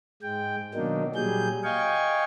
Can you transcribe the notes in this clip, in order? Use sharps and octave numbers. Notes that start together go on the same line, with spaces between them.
G#2 G#3 G5
B2 D#3 F#3 A#3 D4 D#4
A#2 F#3 G3 G#4 G6
D#5 F5 G5 G#5 C#6